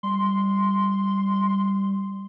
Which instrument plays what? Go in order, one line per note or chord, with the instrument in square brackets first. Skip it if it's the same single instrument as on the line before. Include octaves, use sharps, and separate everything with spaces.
[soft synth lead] G3 [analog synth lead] C6